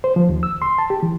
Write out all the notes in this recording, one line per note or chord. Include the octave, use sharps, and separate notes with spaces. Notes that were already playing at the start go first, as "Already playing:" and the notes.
C5
F3
D#2
E6
C6
A5
G4
E3